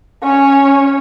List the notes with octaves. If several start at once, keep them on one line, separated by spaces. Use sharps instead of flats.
C#4 C#5